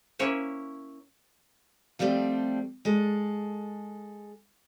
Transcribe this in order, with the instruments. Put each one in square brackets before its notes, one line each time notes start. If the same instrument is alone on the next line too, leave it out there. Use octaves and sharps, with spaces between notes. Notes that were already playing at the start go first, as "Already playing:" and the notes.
[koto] A#3 C#4 E4 C#5
[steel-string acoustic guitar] F3 G3 A3 A#3 C4
G#3 A4